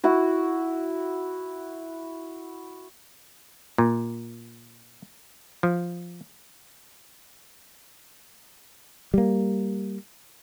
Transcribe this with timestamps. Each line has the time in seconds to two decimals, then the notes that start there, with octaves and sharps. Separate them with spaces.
0.04 E4 F#4
3.78 A#2
5.63 F3
9.14 G3 A#3